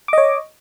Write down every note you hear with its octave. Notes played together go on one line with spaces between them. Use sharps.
C#5 D#5 D6